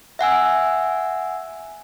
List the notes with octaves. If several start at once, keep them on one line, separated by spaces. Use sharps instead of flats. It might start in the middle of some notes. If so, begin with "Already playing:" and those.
E5 F#5 G#5 E6